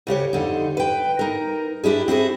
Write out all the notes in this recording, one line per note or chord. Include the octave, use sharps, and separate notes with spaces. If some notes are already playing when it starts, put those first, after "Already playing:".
D2 C#3 G4 C#5
F2 D3 D#4
B4 G5
D#4 A#4
D4 E4 G4 G#4
C4 E4 F#4 G#4